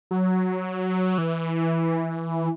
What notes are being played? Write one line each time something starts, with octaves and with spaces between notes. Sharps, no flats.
F#3
E3